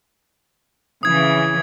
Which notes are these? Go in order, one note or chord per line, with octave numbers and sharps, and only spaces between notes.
C#3 E3 D#6 G#6